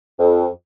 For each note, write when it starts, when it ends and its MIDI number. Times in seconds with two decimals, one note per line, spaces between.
0.19 0.46 41